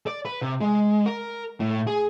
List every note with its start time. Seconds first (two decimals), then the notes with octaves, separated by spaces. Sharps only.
0.07 D5
0.25 B4
0.42 C3
0.61 G#3
1.06 A#4
1.60 A2
1.87 G#4